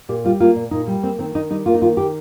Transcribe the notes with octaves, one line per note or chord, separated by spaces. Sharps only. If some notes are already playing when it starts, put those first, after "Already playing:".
A#2 G4
G3 F4
A#3 F4
A#2
A#2 D#4
G3
A#3 C4
D#3 C4
D#3 D#4
G3 D#4
A#3 F4
D#4
D#3 F4
D#3 G4